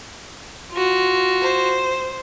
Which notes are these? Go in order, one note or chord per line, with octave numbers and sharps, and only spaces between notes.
F4 F#4
C5